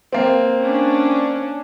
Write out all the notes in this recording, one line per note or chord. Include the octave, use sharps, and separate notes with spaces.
A#3 C4
C#4 D4